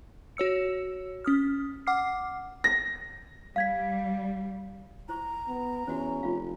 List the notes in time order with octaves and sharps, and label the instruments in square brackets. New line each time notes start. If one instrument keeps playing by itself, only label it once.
[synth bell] F#4 C#5 E6 C#7
C#4 D#6 F6
F#5 D6 F6 C7
[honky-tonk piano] A#6
[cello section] G3 [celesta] F5 G#6 B6
[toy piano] E4 C5 C#6 [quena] A#5
[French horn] B3
[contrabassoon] E2 [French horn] C#4 [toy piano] F#4 C5
[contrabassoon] F1 [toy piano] F4 F5